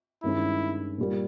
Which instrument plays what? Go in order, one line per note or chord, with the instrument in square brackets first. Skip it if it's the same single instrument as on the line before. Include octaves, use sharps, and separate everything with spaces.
[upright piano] G2 D#3 G#3 C#4 [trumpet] E4
[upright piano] A#2 G3 A#3